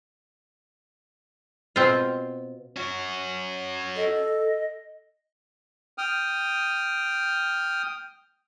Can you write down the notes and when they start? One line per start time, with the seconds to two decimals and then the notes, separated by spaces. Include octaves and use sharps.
1.76 B2 C4 F4
2.76 C#4 F#4
3.96 A4 D#5
5.98 G5 D#6 F6